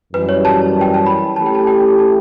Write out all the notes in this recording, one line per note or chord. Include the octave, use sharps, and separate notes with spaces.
F#2 E3 G3 B4
C#5
A5
G5
A5
B5
E3 A3 C#4 G4 A5
G5
A5
G5
A5